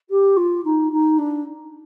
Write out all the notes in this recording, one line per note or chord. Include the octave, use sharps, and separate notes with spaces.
G4
F4
D#4
D#4
D4